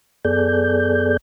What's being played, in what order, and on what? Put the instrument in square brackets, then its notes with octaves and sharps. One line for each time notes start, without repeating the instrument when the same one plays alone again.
[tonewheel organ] F#2 B3 G#4 A4 D5 G6